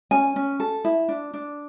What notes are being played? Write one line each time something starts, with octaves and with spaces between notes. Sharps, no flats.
C#4 G#5
C#4
A4
E4
D4
D4